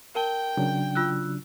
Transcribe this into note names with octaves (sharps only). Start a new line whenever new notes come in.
A#4 G5 A5 G7
C#3 F#3 D4
F4 E6 F#6